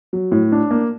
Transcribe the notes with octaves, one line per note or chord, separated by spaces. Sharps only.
F#3
A2
D4
A#3